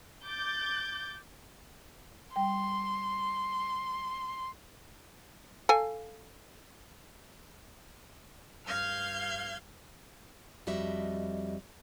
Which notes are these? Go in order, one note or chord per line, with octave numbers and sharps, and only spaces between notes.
D6 G6 A6
G3 G5 C6
A4 F5 G#5
G2 F5 F6 G6 G#6
F2 G3 F#4 D#5 E5